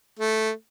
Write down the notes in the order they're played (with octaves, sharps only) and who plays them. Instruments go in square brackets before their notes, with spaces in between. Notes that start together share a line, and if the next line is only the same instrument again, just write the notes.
[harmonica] A3